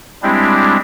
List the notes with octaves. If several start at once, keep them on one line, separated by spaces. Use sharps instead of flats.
G3 G#3 C4 D4 E4 G4